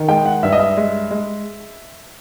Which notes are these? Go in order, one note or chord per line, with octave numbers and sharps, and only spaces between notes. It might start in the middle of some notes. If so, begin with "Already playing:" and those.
Already playing: D#3
G#3 G5
F#5
G2 E5
D#5
E5
G#3
G#3